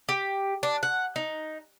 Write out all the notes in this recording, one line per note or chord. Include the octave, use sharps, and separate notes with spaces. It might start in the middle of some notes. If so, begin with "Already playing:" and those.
G4
D4
F#5
D#4